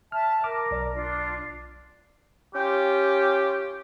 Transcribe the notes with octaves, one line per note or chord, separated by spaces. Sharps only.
E5 A5 F6
A#4 D6 F6
B1 D5
D4 F4
C#4 F4 G4